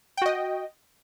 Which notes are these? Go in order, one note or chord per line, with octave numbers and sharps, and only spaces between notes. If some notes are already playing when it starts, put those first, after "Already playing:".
F#4 D#5 G5